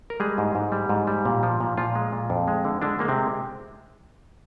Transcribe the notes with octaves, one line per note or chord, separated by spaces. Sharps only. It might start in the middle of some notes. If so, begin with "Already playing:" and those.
A#4
G3 G#3 G#4
G#2
G#2
G3
G#2
G3
A#2
F3
A#2
A#2 F3 F4
G#3
A#2
F2
G#3
D3
D3 G#3 D4
G#3 A#3
C3 C4